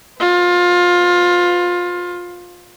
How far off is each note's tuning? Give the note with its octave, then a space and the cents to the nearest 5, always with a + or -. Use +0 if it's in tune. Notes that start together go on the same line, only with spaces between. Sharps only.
F4 +20 B4 +40